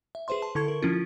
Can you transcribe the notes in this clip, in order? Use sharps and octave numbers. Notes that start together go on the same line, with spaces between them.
E5
G#4 B4 C5 E5 C6
A5
D3 E4 A4 A5 C#6 G#6
A#4
F3 C#4 E4 F4